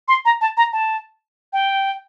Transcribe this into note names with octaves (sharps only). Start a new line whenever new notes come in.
C6
A#5
A5
A#5
A5
G5